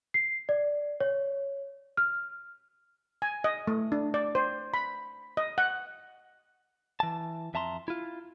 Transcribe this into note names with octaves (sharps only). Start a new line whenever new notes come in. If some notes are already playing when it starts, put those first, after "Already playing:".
C7
D5
C#5
F6
G#5
D#5
A3
D4
D5
C5
B5
D#5
F#5
E3 A5
F2 E5 A5 A#5 C6
E4 F4